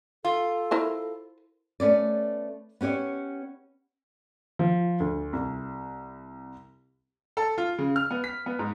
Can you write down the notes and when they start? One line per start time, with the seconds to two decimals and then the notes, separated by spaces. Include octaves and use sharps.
0.25 F4 A4
0.71 E4 A#4 C5
1.80 A3 B3 C#4 D5
2.81 B3 C#4 G4 C#5 D#5
4.59 F3
5.00 D2
5.33 C2
7.37 A4
7.58 F4
7.78 C#3
7.96 F6
8.11 B3
8.24 B6
8.46 B3
8.59 G#2